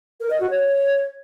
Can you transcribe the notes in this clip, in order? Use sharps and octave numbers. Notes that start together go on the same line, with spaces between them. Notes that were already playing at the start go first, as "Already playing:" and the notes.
A#4
D#5
F#4
C#5